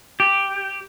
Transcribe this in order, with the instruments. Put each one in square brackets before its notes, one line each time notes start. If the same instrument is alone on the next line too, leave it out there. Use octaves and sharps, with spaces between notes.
[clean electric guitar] G4